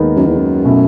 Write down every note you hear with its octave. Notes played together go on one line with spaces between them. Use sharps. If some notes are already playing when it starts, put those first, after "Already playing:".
Already playing: D#2 D#3 G#3 B3 D#4
F#2
E2
F#2
B2 A3 C#4 E4